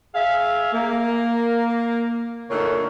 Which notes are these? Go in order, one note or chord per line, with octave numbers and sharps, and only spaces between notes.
G#4 E5 F5
A#3
A#2 D3 A3 D#4 A#4 C#5